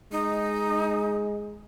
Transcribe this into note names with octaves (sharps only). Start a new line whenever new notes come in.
G#3 D#4